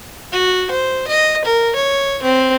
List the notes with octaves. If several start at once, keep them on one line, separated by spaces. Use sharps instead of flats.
F#4
C5
D#5
A#4
C#5
C4